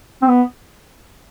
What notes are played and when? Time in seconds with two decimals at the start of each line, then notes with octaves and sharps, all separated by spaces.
0.22 C4
0.28 B3